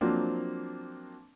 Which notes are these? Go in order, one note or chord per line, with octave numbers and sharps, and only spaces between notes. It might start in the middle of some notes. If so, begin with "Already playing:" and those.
F3 F#3 A#3 C4 D4